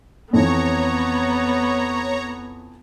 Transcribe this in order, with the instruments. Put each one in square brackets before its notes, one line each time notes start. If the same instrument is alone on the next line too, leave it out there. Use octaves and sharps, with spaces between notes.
[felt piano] F2 E3 [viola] B3 [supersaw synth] C#5 A#5